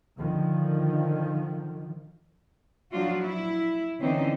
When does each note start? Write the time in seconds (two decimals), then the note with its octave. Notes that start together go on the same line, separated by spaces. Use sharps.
0.18 D3 D#3 F3
2.91 F3 F#3 D4 F4 F#4
3.23 E4
4.00 D3 E3 C4 C#4 D#4